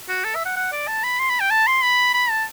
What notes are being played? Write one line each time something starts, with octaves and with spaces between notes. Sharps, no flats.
F#4
A4
E5
F#5
F#5
D5
A5
B5
C6
B5
G5
A5
C6
B5
B5
A5